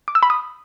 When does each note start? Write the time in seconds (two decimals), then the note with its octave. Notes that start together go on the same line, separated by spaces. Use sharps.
0.08 D6
0.15 E6
0.23 B5
0.30 D#6